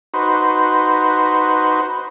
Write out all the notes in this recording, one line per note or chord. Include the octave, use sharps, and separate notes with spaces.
D#4 F#4 B4 C5